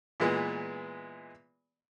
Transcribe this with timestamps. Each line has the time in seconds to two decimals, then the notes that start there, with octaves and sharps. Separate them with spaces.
0.20 A#2 E3 G#3 B3